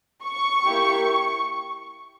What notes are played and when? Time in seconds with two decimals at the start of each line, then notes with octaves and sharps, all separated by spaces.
0.23 C#6
0.65 A#3 E4 G4